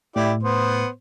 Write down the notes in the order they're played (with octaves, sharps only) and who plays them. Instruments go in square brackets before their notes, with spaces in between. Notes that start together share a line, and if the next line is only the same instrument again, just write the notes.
[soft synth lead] A2 [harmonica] E4 G4 D5
[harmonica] B3 C5